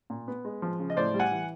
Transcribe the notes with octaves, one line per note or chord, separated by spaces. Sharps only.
A#2
B3
G#3
F3
C#3
D#5
A2 C5 D5
G3
F#5 G#5
E3